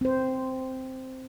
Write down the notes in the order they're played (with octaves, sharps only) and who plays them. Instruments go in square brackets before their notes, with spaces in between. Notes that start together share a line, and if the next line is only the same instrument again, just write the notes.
[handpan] C4 C5